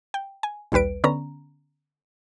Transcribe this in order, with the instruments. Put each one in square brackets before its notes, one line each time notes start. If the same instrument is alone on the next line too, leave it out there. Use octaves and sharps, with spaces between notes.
[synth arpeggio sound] G5
G#5
A#1 D#2 G3 B4 D7
D3 B3 C#4 A#5